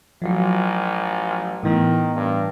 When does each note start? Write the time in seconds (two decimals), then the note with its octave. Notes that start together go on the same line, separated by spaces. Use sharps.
0.22 A1 F3 F#3
1.63 A2 D#3 E3 B3
2.16 G2